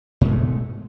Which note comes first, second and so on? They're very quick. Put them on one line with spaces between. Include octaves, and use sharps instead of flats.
G#2 B2 G#3 A3